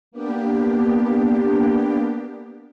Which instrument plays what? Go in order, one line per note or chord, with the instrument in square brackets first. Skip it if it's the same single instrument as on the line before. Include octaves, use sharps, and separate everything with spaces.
[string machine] A#3 B3 D4 G4